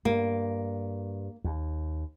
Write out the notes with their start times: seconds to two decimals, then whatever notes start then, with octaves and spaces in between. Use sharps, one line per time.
0.05 G2 A#3
1.44 D#2